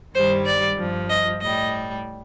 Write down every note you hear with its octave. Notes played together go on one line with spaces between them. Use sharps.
G2 D#3 G3 C5
D5
G2 F3
D#5
A2 G3 D#5